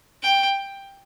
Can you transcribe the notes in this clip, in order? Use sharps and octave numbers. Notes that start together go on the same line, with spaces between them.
G5